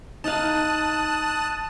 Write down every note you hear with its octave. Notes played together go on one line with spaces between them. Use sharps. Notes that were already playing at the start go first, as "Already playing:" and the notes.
D#4 F5 A5 D#6 F#6